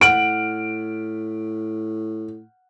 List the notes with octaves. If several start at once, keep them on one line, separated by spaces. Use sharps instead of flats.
A2 F#5 F6 D7 F#7